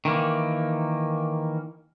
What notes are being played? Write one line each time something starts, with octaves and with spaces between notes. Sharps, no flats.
D#3 E3 A#3